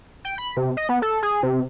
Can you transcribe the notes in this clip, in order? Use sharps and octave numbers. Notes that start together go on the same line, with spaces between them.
G5
B5
C3
D#5
B3
A4
G#4
C3